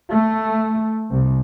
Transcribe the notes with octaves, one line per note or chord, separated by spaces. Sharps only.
A3
C2